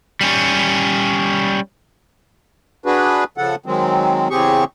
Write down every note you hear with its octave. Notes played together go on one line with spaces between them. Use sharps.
G3 C#4
D4 F#4 G#4 B4
C#3 F3 A4 F#5
D#3 F#3 G#3 C4
E2 C#3 C4 G4 G#4 C#6